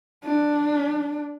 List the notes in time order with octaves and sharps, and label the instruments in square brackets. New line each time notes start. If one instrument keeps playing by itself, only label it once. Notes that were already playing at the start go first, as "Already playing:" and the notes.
[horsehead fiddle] D4